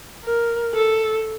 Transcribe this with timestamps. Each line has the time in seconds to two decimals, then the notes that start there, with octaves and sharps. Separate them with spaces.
0.24 A#4
0.74 A4